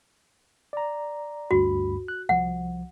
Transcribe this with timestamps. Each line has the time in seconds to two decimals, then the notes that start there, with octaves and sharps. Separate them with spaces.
0.73 D5 A#5
1.51 D2 G2 F#4 B5
2.08 F#6
2.29 C2 F3 F#5